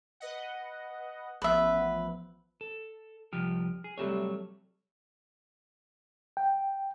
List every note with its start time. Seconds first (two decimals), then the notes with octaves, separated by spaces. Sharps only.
0.20 B4 D#5 F#5
1.42 A1 F3 B3 B4 E5
2.61 A4
3.33 C2 F3 G4 F6
3.84 G#4
3.98 C3 F#3 G3 A3 A4 C#5
6.37 G5